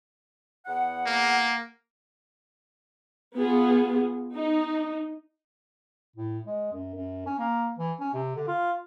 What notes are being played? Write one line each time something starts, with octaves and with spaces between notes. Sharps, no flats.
E2 F#5
A#3
B3 F4 G#4
D#4
A2
G#3
F#2
F#2
C#4
A#3
E3
C#4
C3
D3
F4